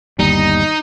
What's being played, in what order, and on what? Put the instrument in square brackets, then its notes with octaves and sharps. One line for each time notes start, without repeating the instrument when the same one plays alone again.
[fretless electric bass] G1 D#2 G3 [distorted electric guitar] D#4